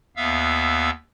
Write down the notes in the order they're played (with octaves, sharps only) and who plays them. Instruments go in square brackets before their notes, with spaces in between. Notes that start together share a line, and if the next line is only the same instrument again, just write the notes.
[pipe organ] D#2 B3 E5 F5 E6